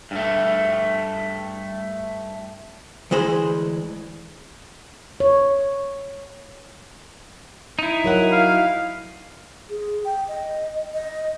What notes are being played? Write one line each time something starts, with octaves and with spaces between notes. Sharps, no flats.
G2 A3
D2 E3 G#3 C5 B5
C#5
D#4 E4
F#3 A#4 F#5
F5
G#4
G5
D#5
D#5